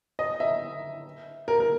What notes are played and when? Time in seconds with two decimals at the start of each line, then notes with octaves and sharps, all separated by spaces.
0.19 D#5
0.40 E5
1.48 A#4
1.60 A#4